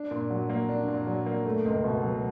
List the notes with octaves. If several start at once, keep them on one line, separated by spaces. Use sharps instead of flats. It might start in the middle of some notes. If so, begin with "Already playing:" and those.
Already playing: D4
A#2
F#3
A#3
D4
A#2
F#3
A#3
A3
C#2
B2
F#3